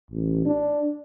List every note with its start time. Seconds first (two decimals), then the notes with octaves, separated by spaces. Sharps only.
0.11 A1
0.45 D4